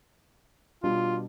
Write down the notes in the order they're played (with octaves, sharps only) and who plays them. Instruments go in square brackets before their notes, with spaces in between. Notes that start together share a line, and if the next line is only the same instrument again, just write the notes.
[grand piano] B2 G3 D4 [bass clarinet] F4